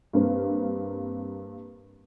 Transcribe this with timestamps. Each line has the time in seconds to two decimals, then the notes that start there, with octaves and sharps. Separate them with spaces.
0.13 G2 A#3 C4